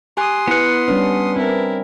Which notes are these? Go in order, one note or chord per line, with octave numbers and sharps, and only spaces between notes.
G4 G#5 C6 D#6 F#6
B3 E4 B4 F#5
G3 C#4 D4 B4
C4 E4 A#4